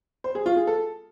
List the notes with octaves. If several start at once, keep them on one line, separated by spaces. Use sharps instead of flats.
C5
G#4
F4
G#4
A4